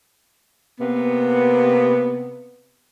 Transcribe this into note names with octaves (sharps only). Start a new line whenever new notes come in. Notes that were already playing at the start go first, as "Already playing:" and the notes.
C3 A#3 B3